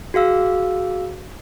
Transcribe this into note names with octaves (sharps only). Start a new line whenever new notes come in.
F#4 G#4 F5 E6